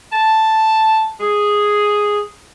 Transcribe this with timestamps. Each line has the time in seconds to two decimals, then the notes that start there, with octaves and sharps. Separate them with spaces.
0.13 A5
1.21 G#4